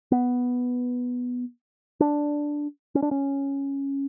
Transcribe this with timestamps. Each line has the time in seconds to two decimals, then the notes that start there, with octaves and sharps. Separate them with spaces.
0.12 B3
2.00 D4
2.95 C#4
3.02 D4
3.11 C#4